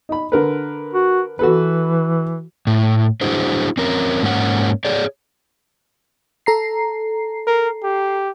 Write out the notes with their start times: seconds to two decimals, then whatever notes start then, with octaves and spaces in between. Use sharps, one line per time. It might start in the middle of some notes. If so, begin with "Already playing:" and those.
0.09 D#4 B5
0.32 D3 A#4 B4
0.94 F#4
1.39 E3 F#4 A4 B4
2.67 A2
3.21 D4 E4 F#4 G#4 C5
3.78 C4 C#4 A#4
4.23 G#2 A#3 C#4 F#5
4.85 G#4 C#5 D5
6.46 A4 A#5 C7
7.47 A#4
7.83 G4